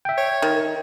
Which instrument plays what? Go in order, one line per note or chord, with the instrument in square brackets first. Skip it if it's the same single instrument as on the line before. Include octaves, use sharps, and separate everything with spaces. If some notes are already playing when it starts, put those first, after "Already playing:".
[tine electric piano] E5 G5
[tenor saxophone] C#5
[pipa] D#3